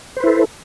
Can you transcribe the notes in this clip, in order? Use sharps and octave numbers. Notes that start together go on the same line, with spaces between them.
E4 A4 B4 C5